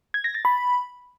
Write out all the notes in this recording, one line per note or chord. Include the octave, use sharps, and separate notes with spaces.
G#6
A#6
A6
B5